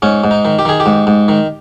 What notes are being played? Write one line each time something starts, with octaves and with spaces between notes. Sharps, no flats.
G#2 C#4
G#2
D#4
D#3
G4
D#3 G#4
G4
G#2
G#2
D#3